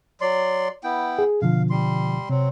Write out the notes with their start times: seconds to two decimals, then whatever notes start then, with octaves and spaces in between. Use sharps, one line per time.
0.21 F#3 D5 C6
0.84 B3 E4 G5
1.19 G#4
1.42 B2 D3 F3 F5
1.70 G3 C6
2.30 C3 F#3 C4